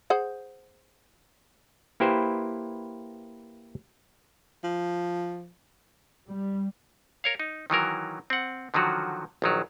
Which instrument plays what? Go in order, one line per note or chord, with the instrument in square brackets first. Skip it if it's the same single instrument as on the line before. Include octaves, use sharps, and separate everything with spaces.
[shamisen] G#4 C5 F#5
[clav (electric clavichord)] A#3 E4 G4 B4 C5
[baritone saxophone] F3
[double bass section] G3
[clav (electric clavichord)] A#4 C#5 F5
D#4
D#3 E3 F#3 A#4
C4 F#5
D3 D#3 F3 F#3 F#4
A#1 D#3 F#3